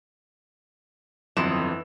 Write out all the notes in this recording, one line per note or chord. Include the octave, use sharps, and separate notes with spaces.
G1 F2 E3 F#3 C6 D#6 E7